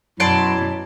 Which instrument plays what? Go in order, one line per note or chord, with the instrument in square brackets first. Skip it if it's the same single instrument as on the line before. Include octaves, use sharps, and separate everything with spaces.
[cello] F#2 B2 [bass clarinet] F#3 [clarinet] E4 [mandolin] D5 A5 C6